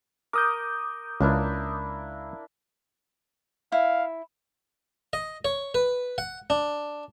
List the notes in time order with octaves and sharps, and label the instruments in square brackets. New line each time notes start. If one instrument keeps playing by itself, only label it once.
[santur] A#4 [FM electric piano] D6 D#6 G6
[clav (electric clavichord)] C#2 [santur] A#3 D4 E4
[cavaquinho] E4 [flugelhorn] F5
[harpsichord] D#5
C#5
B4
F#5
D4